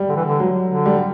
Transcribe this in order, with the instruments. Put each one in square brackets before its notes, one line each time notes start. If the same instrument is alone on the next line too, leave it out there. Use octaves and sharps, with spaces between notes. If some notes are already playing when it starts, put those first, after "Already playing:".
Already playing: [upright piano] G3
[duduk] D3
E3
D3
[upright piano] F#3
[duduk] D3
[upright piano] G3